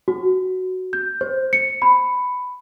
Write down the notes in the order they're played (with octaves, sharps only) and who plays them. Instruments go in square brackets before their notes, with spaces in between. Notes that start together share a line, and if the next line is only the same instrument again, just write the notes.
[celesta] F#4
G6
C5
C#7
B5